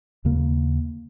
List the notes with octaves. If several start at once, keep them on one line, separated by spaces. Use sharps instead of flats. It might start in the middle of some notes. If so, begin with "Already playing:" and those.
D#2 C#3 A#3